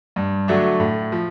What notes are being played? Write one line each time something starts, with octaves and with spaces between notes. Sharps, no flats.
G2
D3 F#3 A3 D4
A2
F3